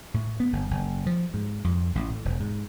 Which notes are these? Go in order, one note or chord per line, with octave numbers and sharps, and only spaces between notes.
A2
B3
G1
F#1
F3
G#2
F2
A1
A2
E1
G#2